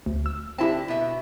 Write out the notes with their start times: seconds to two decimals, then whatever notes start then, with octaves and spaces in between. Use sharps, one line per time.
0.06 D2
0.26 E6
0.58 D3 C4 E4 G4 E5 A5
0.88 B2 E5